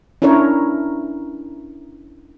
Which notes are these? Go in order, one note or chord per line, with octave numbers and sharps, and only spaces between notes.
C#4 D4 E4 A#4 C#5